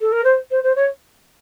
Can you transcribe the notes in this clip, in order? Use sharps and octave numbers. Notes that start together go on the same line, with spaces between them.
A4
A#4
C5
C5
C5
C#5